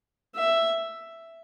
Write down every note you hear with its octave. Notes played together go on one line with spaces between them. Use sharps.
E5